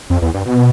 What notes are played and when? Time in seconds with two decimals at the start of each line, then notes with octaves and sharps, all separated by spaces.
0.10 F2
0.22 E2
0.34 G2
0.45 B2